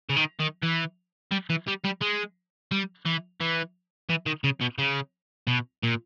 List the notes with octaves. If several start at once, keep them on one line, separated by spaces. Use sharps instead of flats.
C#3
D#3
D#3
E3
G3
E3
G3
G3
G#3
G3
E3
E3
E3
D#3
C#3
B2
C#3
B2
A#2